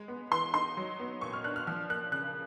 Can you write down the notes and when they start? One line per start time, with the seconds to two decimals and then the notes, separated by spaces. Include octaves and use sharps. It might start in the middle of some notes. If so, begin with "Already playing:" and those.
Already playing: G#3
0.08 B3
0.31 E3 C6
0.54 D#4 C6
0.77 F#3
0.99 B3
1.21 A#2 C#6
1.33 F6
1.44 D4 F#6
1.56 F6
1.67 F3 F6
1.90 A#3 F#6
2.12 C#3 F#6